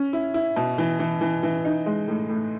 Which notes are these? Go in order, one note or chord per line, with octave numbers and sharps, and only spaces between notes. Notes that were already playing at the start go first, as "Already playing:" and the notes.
Already playing: C#4
E4
E4
B2
E3
E3
E3
E3
D#4
G#3
A2
A2